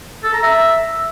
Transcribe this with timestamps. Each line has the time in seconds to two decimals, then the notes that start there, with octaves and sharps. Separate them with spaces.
0.24 A4
0.33 A#5
0.43 E5